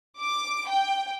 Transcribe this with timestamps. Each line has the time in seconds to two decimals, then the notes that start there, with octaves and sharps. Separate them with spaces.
0.21 D6
0.68 G5